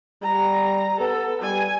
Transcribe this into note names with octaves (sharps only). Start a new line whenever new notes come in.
G3 A#5
B3 A4
G3 G#5